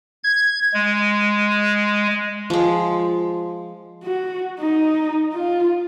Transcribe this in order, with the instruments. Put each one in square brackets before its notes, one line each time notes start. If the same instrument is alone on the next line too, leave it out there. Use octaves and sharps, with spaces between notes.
[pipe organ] G#6
G#3
[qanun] F3 G#3
[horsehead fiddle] F#4
D#4
F4